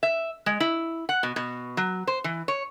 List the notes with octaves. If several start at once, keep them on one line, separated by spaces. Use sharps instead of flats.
E5
G#3
E4
F#5
B2
B2
F#3
C5
E3
C#5